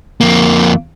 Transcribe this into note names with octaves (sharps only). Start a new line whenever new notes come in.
F2 A#3